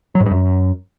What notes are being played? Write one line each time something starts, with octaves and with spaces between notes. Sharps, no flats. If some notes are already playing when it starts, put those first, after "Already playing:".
F#3
G#2
G2
F#2